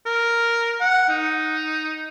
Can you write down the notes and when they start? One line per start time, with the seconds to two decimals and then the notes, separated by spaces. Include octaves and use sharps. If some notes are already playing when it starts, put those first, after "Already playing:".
0.06 A#4
0.80 F#5
1.09 D#4